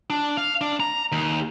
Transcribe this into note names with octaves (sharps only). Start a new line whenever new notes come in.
D4
F5
D4
A#5
D#2